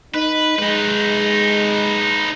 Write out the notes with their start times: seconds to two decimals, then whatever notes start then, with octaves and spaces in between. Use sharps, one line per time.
0.14 D#4 B4
0.59 G#3 D#4 B4